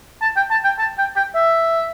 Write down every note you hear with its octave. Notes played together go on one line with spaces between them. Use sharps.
A5
G5
A5
G5
A5
G5
G5
E5